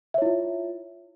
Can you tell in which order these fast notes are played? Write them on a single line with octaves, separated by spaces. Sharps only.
E5 C#5 E4 F4